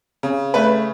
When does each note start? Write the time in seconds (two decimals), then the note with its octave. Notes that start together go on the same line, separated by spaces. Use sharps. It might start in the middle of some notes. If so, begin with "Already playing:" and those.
0.23 C#3
0.54 A3 B4